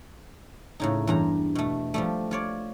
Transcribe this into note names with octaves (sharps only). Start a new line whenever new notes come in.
A2 C#3 D#4
E2 G2 A#5
B2 A3
F3 G3 A3
F4 C#5 D5